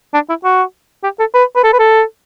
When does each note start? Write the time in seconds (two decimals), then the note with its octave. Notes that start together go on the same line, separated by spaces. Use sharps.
0.14 D4
0.29 E4
0.45 F#4
1.04 G4
1.19 A4
1.34 B4
1.56 B4
1.64 A4
1.73 B4
1.79 A4